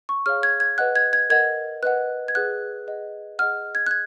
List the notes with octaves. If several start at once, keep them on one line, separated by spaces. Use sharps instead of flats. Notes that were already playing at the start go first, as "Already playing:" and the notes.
C#6
G#4 C#5 F5 F6
G#6
G#6
B4 D#5 F#5 F#6
G#6
G#6
A#4 D#5 F#5 G#6
B4 D#5 F#5 F#6
G#6
G#4 B4 F#5 F#6
G#4 D#5 F#5
G#4 D#5 F#5 F6
G#6
F#6
G#6